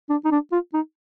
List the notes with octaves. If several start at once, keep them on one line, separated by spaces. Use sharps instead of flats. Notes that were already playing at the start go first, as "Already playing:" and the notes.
D4
D#4
D4
F4
D#4